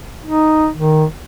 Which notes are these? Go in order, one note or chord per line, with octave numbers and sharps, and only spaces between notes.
D#4
D#3